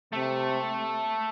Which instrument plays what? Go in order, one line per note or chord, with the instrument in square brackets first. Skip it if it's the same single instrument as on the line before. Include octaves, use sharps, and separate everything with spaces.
[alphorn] C3 [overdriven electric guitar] A3